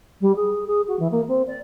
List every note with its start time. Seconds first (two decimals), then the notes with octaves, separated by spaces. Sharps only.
0.21 G3
0.35 G#4
0.67 G#4
0.87 F#4
0.99 E3
1.11 A#3
1.27 C4
1.47 D5